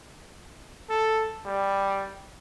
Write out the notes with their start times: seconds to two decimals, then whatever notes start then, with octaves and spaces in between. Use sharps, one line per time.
0.90 A4
1.46 G3